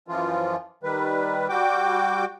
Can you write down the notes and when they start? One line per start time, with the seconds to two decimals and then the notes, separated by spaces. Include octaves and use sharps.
0.08 F#2 E3 F3 F4
0.83 D#3 G3 B4
1.49 G3 F#4 G5 D6